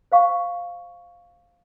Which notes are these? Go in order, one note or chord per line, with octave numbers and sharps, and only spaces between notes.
C5 F5 C#6